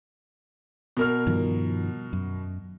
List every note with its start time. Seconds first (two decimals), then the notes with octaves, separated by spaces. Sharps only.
0.97 B2 A#4 F6
1.27 G2 D#3 F3
2.13 F#2